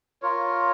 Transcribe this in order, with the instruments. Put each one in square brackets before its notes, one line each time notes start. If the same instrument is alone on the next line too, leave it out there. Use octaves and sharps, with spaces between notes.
[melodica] F4 A#4 C#5